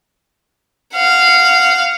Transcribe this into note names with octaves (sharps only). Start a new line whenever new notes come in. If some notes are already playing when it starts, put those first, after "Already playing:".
F5 F#5